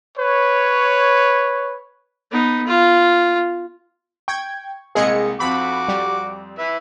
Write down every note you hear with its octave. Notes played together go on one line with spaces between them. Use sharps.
B4 C#5
B3 D#4
F4
G5 C#6 G#6
C2 G#3 A#3 G#4 D#5 C#7
F2 C4 F#4 B5 D6
G3
E4 B4 E5